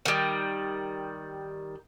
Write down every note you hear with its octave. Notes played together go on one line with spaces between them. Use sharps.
D#3 G3